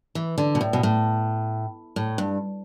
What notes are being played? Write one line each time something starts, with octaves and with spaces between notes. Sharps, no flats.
E3
D3
B2
A2
B2
A2
A2
G2